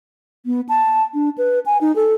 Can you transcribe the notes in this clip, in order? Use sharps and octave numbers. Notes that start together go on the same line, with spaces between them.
B3
A5
D4
B4
G#5
D#4
A4